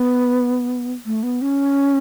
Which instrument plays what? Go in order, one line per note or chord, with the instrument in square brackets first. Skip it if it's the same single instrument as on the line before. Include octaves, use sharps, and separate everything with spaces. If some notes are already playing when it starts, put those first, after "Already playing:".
Already playing: [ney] B3
A3
B3
C#4